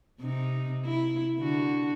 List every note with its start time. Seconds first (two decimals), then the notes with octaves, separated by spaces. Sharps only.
0.21 C3 D#4
0.85 E4
1.39 D3 F#4